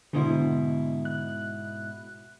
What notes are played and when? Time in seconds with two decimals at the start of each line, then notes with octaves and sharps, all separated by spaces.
0.13 G#2 B2 D3 E4
1.05 F#6